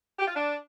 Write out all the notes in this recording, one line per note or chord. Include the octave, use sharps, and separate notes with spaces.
G4
F4
D4